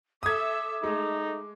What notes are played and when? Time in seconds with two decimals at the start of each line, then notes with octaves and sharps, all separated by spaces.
0.23 A4 E5 D6 D#6 G#6
0.84 G#3 A3 D#4